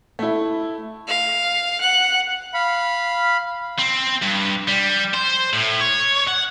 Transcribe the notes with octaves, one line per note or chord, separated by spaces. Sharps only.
A3 E4
F5
F#5
F5 B5
C4
G2
G3
C5
A2
C#5
F#5